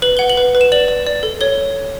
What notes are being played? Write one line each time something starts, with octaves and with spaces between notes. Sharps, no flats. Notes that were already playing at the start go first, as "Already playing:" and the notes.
B4 F#7
F#5 G7
F#7
B4
B4
E7
D5 F#7
D5
D5
A4
C#5 G7